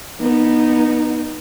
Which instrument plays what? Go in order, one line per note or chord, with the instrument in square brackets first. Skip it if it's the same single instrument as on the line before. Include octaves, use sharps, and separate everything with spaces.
[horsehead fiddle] B3 D#4